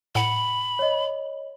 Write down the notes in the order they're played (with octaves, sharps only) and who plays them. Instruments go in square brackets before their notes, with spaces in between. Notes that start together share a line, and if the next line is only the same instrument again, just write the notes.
[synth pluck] A2 F#5 C#7 [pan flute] B5
[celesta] C#5 D#5